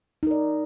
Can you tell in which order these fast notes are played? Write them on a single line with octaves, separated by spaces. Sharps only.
D#4 A#4 D5